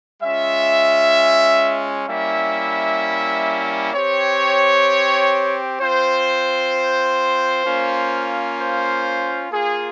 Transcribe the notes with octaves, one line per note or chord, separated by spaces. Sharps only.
G#3 C#4 F4 E5
G3 A#3 C#4 E4 E5
C4 G4 C#5
C4 F4 C5
A#3 C#4 F4
C5
A#3 F4 G#4